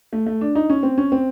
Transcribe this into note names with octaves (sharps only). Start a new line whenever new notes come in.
A3
A3
D4
D#4
C#4
C4
C#4
C4